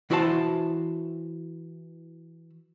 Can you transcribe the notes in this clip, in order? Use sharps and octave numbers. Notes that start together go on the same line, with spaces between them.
E3 E4 F#4 C5 F5 A5